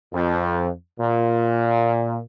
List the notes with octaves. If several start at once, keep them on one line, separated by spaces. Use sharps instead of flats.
F2
A#2